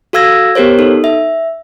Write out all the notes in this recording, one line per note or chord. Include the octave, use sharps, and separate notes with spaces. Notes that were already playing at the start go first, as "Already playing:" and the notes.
F#4 A4 F5 E6 G#6 A#6
B3 G4 A#4 C5 C#5
D#4 A4
E5